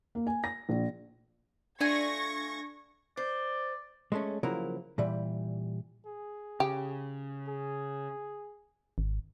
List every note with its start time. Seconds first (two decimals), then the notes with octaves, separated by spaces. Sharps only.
0.15 A#3
0.27 G#5
0.44 A#6
0.69 A#1
1.81 A3 D4 F4 G#5 C#6 G#6 A#6
3.17 C5 D5
4.12 G#3 A3 C#4
4.43 C#3 F3 F#3 A#3 E4 A#4
4.98 A#2 E3 G3
6.06 G#4
6.60 C#3 G4
7.48 G#4
8.98 G#1